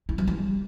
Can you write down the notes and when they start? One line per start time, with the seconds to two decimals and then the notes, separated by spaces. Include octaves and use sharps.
0.09 E4
0.18 F#3
0.27 G3